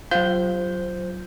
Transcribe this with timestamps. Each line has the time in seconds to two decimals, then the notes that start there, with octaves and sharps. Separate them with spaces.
0.11 F#3 F4 C5 F5 G6